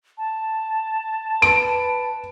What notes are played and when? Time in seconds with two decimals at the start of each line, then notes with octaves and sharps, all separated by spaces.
0.18 A5
1.42 B4 D7